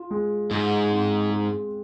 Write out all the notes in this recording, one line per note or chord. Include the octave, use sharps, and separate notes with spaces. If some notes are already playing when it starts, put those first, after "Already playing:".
Already playing: F4
G#3
G#2 G#3
C4
G#3